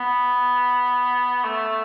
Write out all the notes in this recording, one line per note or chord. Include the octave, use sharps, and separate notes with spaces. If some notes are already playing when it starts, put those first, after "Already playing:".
Already playing: B3
A3